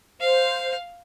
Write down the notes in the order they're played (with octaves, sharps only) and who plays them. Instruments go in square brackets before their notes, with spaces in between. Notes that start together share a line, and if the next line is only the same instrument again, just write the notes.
[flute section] C5 [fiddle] F5